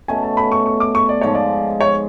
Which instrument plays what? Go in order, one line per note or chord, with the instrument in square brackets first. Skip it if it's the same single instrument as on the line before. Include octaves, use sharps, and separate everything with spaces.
[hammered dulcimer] B2 A3 C#4 [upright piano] G#5
[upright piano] A5
B5
C#6
C#6
D6
C#6
D5
[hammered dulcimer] G#2 F3 G#3 [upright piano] C#5
[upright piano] D5
C#5